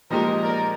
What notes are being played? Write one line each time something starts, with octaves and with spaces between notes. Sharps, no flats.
A#2 F3 G#3 D#4 G4 A#4
A#4 D5